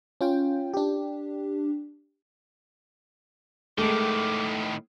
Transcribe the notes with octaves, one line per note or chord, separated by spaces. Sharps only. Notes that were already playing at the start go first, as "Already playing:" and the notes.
C#4 F4 G5
D4 G4
A2 D#3 G#3 A3 D6